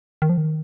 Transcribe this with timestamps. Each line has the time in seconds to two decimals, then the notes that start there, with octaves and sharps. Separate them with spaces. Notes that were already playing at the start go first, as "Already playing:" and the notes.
0.22 D#3
0.29 F3
0.38 D#3